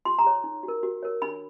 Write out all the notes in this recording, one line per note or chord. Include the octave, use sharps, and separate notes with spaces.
F4 C6
A#5
G#4 C#5
D#4
F#4
A#4
F#4
A#4 C#5
D4 B5